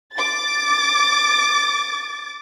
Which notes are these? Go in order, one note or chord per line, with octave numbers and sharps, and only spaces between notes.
D6 A6